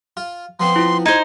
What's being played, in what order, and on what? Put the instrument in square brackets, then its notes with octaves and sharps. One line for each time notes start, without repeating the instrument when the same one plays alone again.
[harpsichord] F4
[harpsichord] F3 B3 C4 [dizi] C6
[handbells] E4 F4
[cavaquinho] D#4 C5 [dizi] G#6